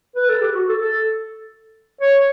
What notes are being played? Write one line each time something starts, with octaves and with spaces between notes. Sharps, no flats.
B4
A4
G4
F#4
A4
A4
C#5